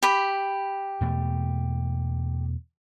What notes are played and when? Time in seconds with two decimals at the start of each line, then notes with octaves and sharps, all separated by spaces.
0.03 G4 B5
1.01 E2 B2 A3